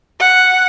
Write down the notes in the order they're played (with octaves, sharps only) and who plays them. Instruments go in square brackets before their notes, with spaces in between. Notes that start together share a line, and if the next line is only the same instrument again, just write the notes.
[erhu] F#5